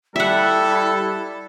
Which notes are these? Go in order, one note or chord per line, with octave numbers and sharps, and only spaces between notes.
G3 E4 A4 E5 F#5